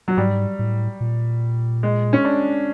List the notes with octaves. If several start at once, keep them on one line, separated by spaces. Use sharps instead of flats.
F#3
G#2 G3
A2
A#2
G#3
C#4
D4